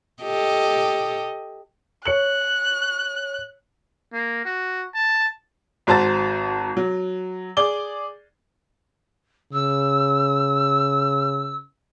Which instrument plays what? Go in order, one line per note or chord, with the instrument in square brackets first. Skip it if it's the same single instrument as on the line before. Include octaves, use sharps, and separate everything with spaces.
[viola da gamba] G4 A4 D#5
[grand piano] C#5 C#7 F#7 [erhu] F#6
[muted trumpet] A#3
F#4
A5
[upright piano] G#1 F#4 C5 A5 A#5 A6
F#3
G#4 D5 D6 G7
[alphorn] C#3 [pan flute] E6